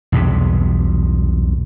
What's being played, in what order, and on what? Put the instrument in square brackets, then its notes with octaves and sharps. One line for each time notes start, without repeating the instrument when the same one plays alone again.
[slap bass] B1 E2 G2 C3